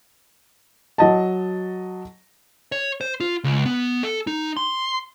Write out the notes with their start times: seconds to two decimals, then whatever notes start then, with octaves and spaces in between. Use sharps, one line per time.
0.98 F#3 D#5 A5
2.72 C#5
3.01 C5
3.20 F4
3.44 C#2
3.66 B3
4.03 A4
4.27 D#4
4.57 C6